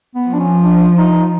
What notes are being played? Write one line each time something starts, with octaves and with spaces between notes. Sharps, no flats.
B3
F3
D4
C#4
D4
D#4